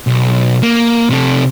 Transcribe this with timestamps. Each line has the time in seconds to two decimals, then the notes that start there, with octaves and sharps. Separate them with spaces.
0.07 B1
0.63 A#3
1.10 C3 A4